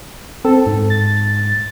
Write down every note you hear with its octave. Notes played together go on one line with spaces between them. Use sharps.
C4 A4
G#2
A6